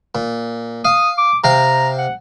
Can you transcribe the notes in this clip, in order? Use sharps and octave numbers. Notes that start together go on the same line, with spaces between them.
A#2
F5 D#6
D6
C3 F5 G5 A#5
F#5